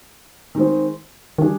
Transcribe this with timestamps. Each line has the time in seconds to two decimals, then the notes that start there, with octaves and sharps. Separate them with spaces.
0.55 D#3 G#3 C4
1.38 D#3 G3 D4 G#4